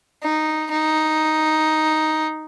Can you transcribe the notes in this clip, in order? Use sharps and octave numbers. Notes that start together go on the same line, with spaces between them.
D#4
D#4